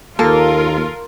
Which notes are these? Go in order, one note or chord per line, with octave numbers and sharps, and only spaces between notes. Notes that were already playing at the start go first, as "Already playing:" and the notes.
D#2 A#3 F4 A4 A#4